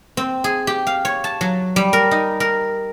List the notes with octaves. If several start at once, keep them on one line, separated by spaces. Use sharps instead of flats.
C4
G#4
G4
F5
C#5
A5
F#3
G3
A#4
D#4
A#4